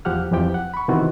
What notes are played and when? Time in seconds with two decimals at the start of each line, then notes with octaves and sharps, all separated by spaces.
0.05 E2 F3 G4 F#5 F6
0.31 F2 E3 F3 G4 G5
0.54 F#5
0.74 B5 C#6
0.88 C3 D#3 E3 B3 C4 F#4